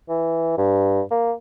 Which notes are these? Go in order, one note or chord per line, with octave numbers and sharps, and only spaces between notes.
E3
G2
A#3